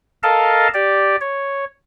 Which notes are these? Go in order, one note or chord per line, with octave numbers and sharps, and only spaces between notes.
A4 A#4 D#5 F5 A5
G4 D5
C#5